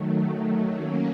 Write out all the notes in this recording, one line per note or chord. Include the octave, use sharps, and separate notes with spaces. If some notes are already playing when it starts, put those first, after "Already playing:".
Already playing: D#3 F#3 A3
F#3 A#3 C#4